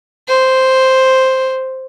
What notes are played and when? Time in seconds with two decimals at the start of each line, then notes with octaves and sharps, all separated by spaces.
0.28 C5